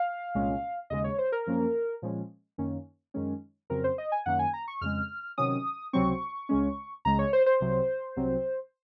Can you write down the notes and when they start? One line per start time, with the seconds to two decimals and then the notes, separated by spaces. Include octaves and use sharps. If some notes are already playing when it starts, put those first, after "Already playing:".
Already playing: F5
0.35 C2 A#2 G#3 C#4
0.90 D#2 C#3 G#3 D#5
1.04 C#5
1.18 C5
1.32 A#4
1.47 F#2 F3 A#3 C#4
2.02 A#2 F3 G#3 C#4
2.58 F#2 D#3 A#3 C#4
3.14 F#2 D#3 G#3 C#4
3.70 F2 C#3 F#3 C4 A#4
3.84 C5
3.98 D#5
4.12 G#5
4.26 F#2 D#3 A#3 C#4 F#5
4.39 G#5
4.54 A#5
4.68 C#6
4.81 F2 C#3 G#3 F6
5.38 C3 D#3 F#3 C#4 D#6
5.93 C#2 C3 F#3 C4 C#6
6.49 C#2 C#3 G#3 C#4
7.05 C#2 C#3 G#3 A#5
7.19 C#5
7.33 C5
7.46 C5
7.60 C2 C3 F#3
8.16 C2 C3 F#3 C4